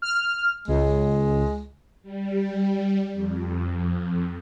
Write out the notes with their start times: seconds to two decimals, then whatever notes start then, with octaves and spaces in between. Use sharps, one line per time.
0.02 F6
0.68 C#2 G#3
2.03 G3
3.13 F2